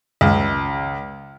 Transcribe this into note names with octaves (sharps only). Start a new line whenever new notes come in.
C#2